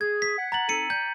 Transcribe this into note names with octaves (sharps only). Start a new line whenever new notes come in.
G#4 G#6
B6
F#5
A#5 A6 F#7
C4 D#4 A4 C#7 D#7
D5 G5 G6